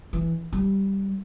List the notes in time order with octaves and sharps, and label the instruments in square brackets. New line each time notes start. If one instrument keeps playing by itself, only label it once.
[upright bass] E3
G3